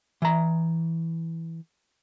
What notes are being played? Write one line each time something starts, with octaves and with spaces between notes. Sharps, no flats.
E3 A#5